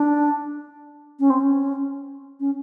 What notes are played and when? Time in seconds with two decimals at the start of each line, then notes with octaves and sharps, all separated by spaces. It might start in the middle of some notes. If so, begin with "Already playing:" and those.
Already playing: D4
1.20 C#4
1.30 C4
1.40 C#4
2.40 C#4